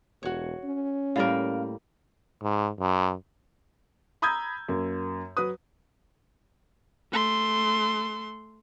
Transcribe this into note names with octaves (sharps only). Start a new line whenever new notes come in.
E1 F#4 C#5
C#4
A2 G3 A#3 A#4 F5
G#2
F#2
A#5 B5 D#6 E6 G6 G#6
F#2 A#3
F#3 B4 D#6
A3 C6